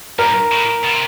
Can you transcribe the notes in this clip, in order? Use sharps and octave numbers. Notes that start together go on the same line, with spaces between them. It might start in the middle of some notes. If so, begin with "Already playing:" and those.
G2 A#4
A2
B2
C3